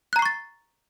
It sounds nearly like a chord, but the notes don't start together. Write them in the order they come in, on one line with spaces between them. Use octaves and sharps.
F#6 A#5 C7 C#6 A6